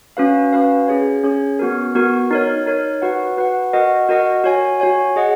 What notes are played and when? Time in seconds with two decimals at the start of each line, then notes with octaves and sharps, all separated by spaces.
0.17 C#4 F#4 B4 F5
0.53 C#4 F#4 B4 F5
0.88 C#4 G#4 C#5
1.24 C#4 G#4 C#5
1.59 B3 F#4 A#4
1.95 B3 F#4 A#4
2.31 D#4 A#4 C#5
2.66 D#4 A#4 C#5
3.02 F#4 B4 F#5
3.37 F#4 B4 F#5
3.73 F#4 A#4 D#5 F#5
4.09 F#4 A#4 D#5 F#5
4.44 F#4 C#5 G#5
4.80 F#4 C#5 G#5
5.16 G#4 D#5 F#5